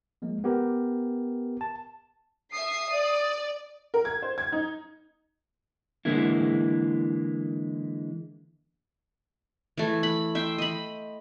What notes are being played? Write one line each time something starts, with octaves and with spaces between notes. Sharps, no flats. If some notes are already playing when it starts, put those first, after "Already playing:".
F3 G#3 A#3
B3 G4 A#4
A5
E5 D#6 C7
D5
A#4
G#6
C5
G#6
D#4
D3 E3 G#3 A#3 E4
E3 A3
B5
E5 G5 C6
D#5 B5